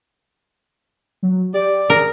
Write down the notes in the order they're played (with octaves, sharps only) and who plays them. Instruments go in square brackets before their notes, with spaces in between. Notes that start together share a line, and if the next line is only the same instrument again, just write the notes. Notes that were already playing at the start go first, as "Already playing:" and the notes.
[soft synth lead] F#3
[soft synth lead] G4 [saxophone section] D5
[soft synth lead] G#4 [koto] A#4